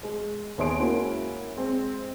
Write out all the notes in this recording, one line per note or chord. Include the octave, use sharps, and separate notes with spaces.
G#3
D#2 B3 G#4 C#5 C6 D7
G#3 A#3 C#4 E4 F#4
G#3 C4